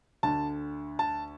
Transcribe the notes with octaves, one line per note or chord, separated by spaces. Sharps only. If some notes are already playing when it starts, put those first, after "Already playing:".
D2 D3 A5
A5